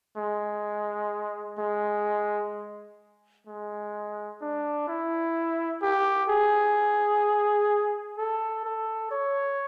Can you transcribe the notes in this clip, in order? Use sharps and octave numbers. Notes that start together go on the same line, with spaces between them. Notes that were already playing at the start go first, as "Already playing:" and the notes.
G#3
G#3
G#3
D4
E4
G4
G#4
A4
A4
C#5